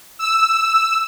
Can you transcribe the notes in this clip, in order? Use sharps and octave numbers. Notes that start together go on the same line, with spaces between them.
E6